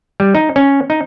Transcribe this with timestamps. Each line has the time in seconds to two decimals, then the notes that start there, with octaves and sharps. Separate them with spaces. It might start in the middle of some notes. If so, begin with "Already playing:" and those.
0.20 G3
0.35 D#4
0.56 C#4
0.90 D#4